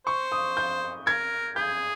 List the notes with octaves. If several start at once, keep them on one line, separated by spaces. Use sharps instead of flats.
C5 C#6
D#6
G6
A#4 G#6
G#4 G6